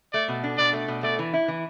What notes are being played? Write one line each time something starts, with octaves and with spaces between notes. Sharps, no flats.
A3 D5
B2
D4
B2 D5
A3
B2
A3 D5
E3
E4
E3